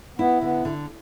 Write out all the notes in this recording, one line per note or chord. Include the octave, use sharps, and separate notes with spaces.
B3 E4
D3 B3
D3